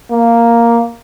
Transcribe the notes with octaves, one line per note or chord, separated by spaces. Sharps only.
A#3